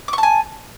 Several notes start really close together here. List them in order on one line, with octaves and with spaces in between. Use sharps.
D6 C#6 A5 G#5